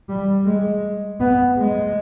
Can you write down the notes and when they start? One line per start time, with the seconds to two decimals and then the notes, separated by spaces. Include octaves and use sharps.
0.09 G3
0.45 G#3
1.20 B3
1.57 G#3